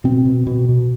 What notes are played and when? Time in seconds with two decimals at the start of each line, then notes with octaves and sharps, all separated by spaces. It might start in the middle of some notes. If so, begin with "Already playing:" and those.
0.04 B2 C4
0.25 B2
0.47 B2
0.69 B2